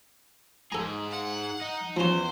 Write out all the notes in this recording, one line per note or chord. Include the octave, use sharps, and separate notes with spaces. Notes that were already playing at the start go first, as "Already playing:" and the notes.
G#2 G#4 A4 A#5
F#5
D#4
E2 F3 C#4 C5